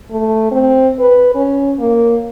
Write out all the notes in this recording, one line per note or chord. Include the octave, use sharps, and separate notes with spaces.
A3
C4
B4
C#4
A#3